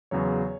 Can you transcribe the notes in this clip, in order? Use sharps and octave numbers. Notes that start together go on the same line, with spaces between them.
E2 C#3 F#3 C#5